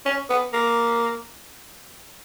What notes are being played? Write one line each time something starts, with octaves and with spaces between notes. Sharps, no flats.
C#4
B3
A#3